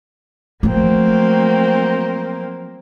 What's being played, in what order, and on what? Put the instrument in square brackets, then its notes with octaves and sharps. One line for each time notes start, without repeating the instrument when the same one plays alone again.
[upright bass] F3 A3 [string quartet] F#3 A#3 C4